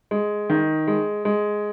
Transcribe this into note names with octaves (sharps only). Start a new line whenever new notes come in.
G#3
D#3
G#3
G#3